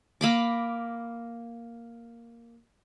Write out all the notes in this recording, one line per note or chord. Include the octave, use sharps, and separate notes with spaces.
A#3 B5 D6